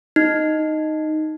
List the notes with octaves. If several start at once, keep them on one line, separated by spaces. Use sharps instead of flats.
D#4